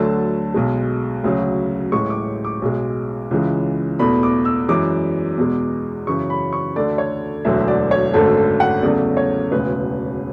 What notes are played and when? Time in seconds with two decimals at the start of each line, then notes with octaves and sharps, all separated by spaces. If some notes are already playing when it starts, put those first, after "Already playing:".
Already playing: D2 D3 F#3 A3 A5
0.54 B1 B2 G#3
1.24 D2 C#3 F#3
1.92 A1 A2 G#3 C#6
2.10 D6
2.45 D6
2.62 B1 B2 G#3
3.31 C#2 C#3 E3 G#3
3.99 E2 B2 A3 B5
4.23 D6
4.45 E6
4.69 F#2 E3 G#3 D6
5.38 E2 B2 G#3
6.07 F#2 C#3 E3 C#6
6.30 B5
6.53 C#6
6.76 D2 D3 A3 D5
6.98 C#5
7.45 E1 D2 D3 F#3 E5
7.68 D5
7.91 C#5
8.14 G#1 F#2 D3 A3 A4
8.37 A4
8.60 F#5
8.83 E2 C#3 F#3 A3 D5
9.17 C#5
9.52 E1 D2 C#3 B4